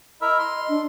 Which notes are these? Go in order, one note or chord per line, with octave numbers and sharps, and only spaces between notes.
E4 A#4 D#5 E5
C6
D4